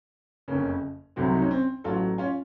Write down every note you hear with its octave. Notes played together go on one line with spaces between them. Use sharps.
F#1 F2 C#3 A#3 C#4
C2 C3 F#3 A3 C4
D#4
C#4
C4
A1 A2 F#3 A3 F4 A4
C#4 F4